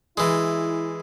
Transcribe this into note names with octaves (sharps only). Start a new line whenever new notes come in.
E3 G#3 E4